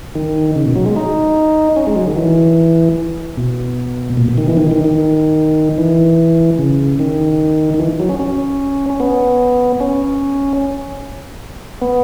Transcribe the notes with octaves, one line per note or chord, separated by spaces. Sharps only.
D#3
C#3
B2
F#3
G#3
D#4
C#4
G#3
F#3
D#3
E3
B2
A#2
B2
D#3
E3
D#3
D#3
D#3
E3
C#3
D#3
D#3
E3
F#3
C#4
C#4
C#4
B3
C#4
B3